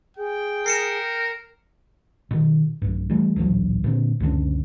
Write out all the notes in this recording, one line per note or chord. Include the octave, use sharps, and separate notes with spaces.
G#4 G5
A#4 C7 C#7 E7
B2 D#3
B1 G2
E3 G3 A3
D1 A#1 E3 F#3
A#2 D3 C4
C#2 F#2 D3 C#4